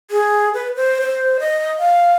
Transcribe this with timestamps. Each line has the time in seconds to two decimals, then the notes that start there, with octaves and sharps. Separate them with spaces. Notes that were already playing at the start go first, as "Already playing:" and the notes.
0.11 G#4
0.54 B4
0.76 C5
1.01 C5
1.40 D#5
1.79 F5